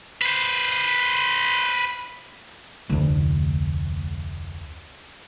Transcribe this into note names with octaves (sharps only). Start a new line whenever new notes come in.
B4 C5
F1 D2